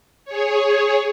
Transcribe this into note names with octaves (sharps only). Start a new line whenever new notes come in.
G#4 C#5